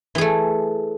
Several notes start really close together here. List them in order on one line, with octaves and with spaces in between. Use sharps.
E3 G#4 A3